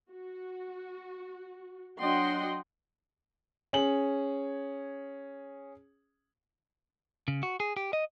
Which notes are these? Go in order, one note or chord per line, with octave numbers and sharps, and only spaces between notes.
F#4
F#3 D4 D#5 F#5 G5 C6
C#4 G#4 F#7
C#3
F#4
G#4
G4
D#5